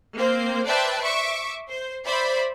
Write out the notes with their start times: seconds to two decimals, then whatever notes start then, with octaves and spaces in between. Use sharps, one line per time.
0.17 A#3 C4 C5
0.67 B4 C5 D5 E5 G5 A5
1.02 E5 C#6 D6
1.70 C5
2.05 C5 D5 E5 B5